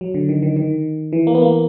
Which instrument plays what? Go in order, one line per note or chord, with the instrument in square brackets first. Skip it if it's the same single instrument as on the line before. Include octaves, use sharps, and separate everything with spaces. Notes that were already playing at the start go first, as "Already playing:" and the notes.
[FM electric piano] F#3
D3
D#3
D#3
D#3
E3
A#3
B3
A#3